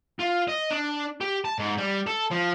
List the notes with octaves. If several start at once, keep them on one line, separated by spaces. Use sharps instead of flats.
F4
D#5
D4
G4
A5
G#2
G3
A4
F3